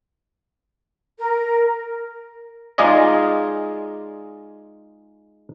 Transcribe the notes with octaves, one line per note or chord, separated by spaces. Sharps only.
A#4
G#3 D#4 F4 G#4 D5 D#5